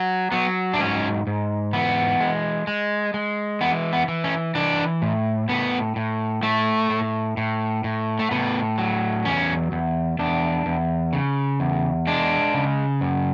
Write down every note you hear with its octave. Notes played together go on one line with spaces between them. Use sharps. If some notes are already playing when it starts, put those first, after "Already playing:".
Already playing: F#3
F#3 B3
D4
G#2 C#4
G#2
E3 B3
G#3
G#3
G#3
E3 B3
B3
E3
C#4
E3 D4
A2
A2 B3
A2
A2 A3
A2
A2
A2
A3
A2 B3
F#3
E2 C#4
E2
E2 D4
E2
C#3
E2
G#3 D4
C#3
F#2